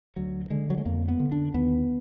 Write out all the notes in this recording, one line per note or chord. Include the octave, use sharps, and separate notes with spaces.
D2 F#3
D3 G#3
F#3
G#3
F2 A#3
B3
D3
D4
D#2 B3